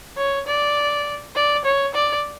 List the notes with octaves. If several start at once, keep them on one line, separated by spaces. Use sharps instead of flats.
C#5
D5
D5
C#5
D5